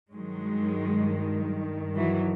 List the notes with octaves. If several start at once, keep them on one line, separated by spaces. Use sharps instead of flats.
G2 D#3 F#3 G#3
E3 F#3